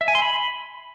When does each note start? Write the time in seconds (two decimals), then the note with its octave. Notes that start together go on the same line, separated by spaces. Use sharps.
0.01 E5
0.08 G#5
0.15 C6
0.22 B5